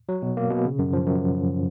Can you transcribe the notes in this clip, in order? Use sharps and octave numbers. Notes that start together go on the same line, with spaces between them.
F#3
B2
A#3
B2
C#3
F#2
F3
F#2